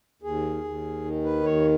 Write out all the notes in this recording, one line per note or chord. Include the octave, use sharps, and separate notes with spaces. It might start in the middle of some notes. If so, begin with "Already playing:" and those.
D#2 G#4
D#2
D#3
B4
D#2 C#5